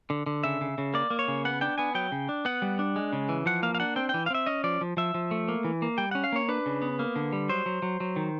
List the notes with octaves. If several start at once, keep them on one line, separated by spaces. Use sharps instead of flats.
D3
D3
C#3 E5
C#3
C#3
A#3 D5
A#3
C#5
C#3
B3 F#5
D4 G5
B3 G#5
F#3 G5
C#3
D4
B3 F#5
G3
D4
G#3
C#3
E3
F3 F#5
A#3 F5
F5
D4 F#5
C4 G5
E3 G5
F5
C4 E5
C#4 D#5
F3 D5
F3
F3 E5
F3
A3
A#3
E3
A#3
G3 G5
C#4 F#5
F5
A#3 C#5
D4 B4
C#3
B3
A#3
D3
G3
F#3 C5
F#3
F#3
F#3
D#3